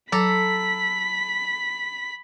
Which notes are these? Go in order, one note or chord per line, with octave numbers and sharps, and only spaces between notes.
F#3 A4 A#5 B5 B6